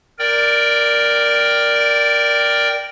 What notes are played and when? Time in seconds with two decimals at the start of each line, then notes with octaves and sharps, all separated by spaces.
0.19 A#4 D5 G5